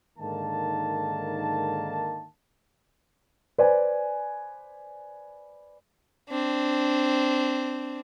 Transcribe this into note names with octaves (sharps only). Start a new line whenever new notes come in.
G#2 D3 D#3 A#3 A5
B4 C5 D5 G#5
C4 D4